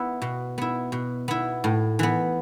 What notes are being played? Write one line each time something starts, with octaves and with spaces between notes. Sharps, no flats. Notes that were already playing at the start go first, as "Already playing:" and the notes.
Already playing: B3 E4
B2
B3 E4
B2
B3 E4
A2
E3 B3